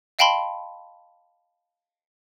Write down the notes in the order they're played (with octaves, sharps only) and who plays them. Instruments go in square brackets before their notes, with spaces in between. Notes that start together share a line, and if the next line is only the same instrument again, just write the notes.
[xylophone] D#5 F5 G5 A5 B5 C6